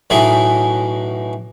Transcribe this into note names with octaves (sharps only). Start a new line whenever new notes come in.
B1 A2 E3 F#3 G#4 G#5